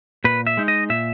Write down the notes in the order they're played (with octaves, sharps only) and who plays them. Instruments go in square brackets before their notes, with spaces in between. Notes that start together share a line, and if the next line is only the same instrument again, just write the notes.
[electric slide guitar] A#2 B4
E5
G#3 D#4
D#5
A#2 E5